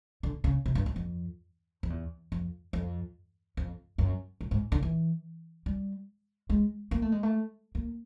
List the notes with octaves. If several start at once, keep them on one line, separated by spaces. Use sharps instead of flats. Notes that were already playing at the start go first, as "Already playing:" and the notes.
D3
C#3
C3
G2
F#2
F2
F2
E2
F2
F2
F2
F#2
G2
G#2
D3
E3
G3
G#3
A#3
A3
G#3
A3
A#3